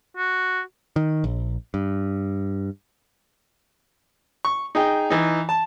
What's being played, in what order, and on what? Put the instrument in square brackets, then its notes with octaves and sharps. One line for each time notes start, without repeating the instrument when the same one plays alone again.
[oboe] F#4
[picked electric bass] D#3
A#1
G2
[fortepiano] C#6
D#4 G#4 G5
E3 D#4
A5